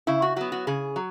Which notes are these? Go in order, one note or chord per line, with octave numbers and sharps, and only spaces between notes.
C#3 E4
F#4
F#3 B3 F#4
F#4
C#3 G#4
F#3